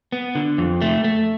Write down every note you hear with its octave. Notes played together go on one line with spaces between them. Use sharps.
B3
D3
F2
A3
A3